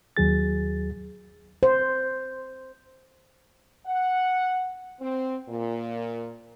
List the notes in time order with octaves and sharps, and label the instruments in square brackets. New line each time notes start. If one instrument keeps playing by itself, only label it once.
[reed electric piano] D#2 F#3 G#4 A6
[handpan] C5
[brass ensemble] F#5
C4
A#2